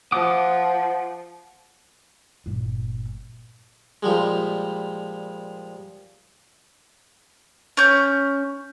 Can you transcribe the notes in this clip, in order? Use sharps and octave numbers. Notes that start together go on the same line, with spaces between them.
F3 F#5 D6 D#6
G1 A#2
A#2 F3 G3 G#3
C#4 G6